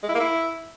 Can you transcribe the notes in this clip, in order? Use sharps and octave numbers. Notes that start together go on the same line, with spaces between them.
G#3
E4
A#3
E4